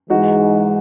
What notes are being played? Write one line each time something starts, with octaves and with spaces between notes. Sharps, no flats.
G#2 E3 G#3 D#4 F#4